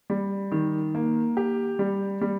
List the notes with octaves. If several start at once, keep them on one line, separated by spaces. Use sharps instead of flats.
G3
D#3
A#3
G4
G3
G3